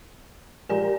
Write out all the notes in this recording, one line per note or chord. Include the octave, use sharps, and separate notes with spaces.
A#2 F3 G#3 G4 A#4 D5 G#5